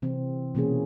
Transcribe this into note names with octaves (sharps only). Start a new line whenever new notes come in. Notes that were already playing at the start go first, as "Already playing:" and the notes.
C3 E3 C4
B2 E3 A#3 C#4 G#4